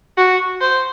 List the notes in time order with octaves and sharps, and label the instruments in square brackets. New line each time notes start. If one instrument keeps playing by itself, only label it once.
[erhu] F#4
C5